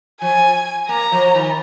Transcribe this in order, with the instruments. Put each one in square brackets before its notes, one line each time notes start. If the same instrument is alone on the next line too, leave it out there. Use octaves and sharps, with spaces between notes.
[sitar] F3 [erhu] G#5
[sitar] A#3 [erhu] A#5
[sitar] F3
D#3